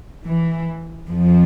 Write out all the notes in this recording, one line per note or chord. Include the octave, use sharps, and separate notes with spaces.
E3
F2 F3